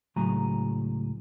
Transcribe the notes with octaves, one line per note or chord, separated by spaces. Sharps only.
C#2 A2 F#3 G#5 A#5